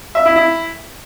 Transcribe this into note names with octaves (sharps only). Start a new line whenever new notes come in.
E5
E4
E4